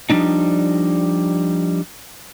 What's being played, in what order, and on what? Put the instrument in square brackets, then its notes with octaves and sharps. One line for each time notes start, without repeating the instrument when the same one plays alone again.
[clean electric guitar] F3 G3 G#3 D4 D#4